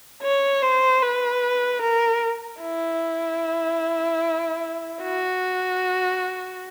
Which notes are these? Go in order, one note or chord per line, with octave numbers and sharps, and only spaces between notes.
C#5
C5
B4
A#4
E4
F#4